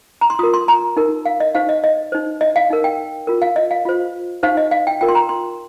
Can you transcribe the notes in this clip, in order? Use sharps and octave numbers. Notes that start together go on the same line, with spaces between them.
A#5
C6
F4 A#4 D#6
C6
A#5
D#4 A#4
F5
D#5
D#4 G4 C5 F5
D#5
D#5
D#4 C5
D#5
F5
D#4 A#4
G5
F4 A#4
F5
D#5
F5
F4 C5
D#4 G4 C5 F5
D#5
F5
G5
F4 A#4 G5
C6
A#5
C6